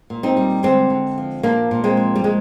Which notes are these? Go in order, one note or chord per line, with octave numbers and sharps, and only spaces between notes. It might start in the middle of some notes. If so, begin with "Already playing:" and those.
A#2
C4 D#4
G3
D3 G#3 C4
D3
F3
A#2 A#3 D4
A#2
G#3 C4
F3
G3
A#2 G#3